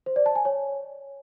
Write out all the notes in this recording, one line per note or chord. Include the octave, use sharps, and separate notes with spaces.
C5
D5
A5
G#5
C#5